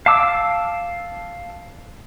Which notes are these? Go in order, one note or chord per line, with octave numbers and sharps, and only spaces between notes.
F5 A5 D6 E6